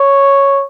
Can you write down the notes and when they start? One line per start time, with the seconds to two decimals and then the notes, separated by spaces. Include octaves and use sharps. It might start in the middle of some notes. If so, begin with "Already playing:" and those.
Already playing: C#5